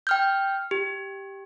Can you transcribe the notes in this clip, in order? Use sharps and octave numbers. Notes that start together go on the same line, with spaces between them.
G5 F6 G6
G4